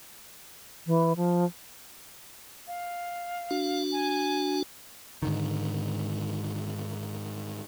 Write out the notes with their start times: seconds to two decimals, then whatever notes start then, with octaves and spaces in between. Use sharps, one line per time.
0.87 E3
1.16 F3
2.67 F5
3.51 D4 F#4
3.92 G#5
5.22 G#2 D3 D#3